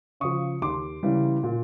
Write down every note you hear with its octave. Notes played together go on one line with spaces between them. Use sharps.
C#3 F3 C#6 D#6
D#2 C6 D6
C#3 E3 G3
A#2